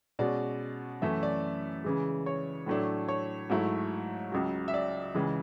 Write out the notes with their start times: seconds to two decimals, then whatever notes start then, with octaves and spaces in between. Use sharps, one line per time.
0.19 B2 G#3 C#4 D5
1.01 F#2 E3 A3 C#4 E5
1.23 D5
1.84 C#3 E3 G#3
2.26 C#5
2.67 A2 F#3 A3 D4
3.08 C#5
3.50 G#2 F#3 A3 E4
4.32 C#2 C#3 F#3
4.68 E5
4.74 D5
5.15 C#2 C#3 E3 G#3